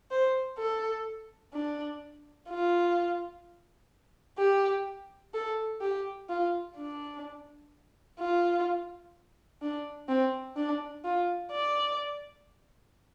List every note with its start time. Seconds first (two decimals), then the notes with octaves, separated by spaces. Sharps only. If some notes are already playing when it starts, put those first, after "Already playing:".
0.11 C5
0.59 A4
1.53 D4
2.49 F4
4.38 G4
5.34 A4
5.81 G4
6.29 F4
6.77 D4
8.19 F4
9.62 D4
10.08 C4
10.57 D4
11.04 F4
11.52 D5